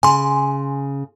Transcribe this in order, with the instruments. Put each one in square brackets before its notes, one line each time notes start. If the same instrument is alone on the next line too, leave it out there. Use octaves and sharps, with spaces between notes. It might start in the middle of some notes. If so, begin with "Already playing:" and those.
[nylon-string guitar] C#3 [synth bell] G#5 C6